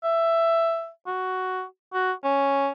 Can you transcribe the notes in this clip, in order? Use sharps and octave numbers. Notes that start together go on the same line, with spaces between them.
E5
F#4
F#4
C#4